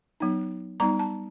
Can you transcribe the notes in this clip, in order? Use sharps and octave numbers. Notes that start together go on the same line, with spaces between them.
F#3 B3 D#4
G3 B3 D#4 A#5
A5